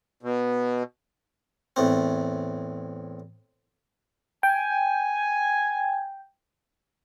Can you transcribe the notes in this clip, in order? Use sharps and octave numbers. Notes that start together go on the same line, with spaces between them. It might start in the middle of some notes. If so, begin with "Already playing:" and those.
B2
E2 A2 C4
G5 G#5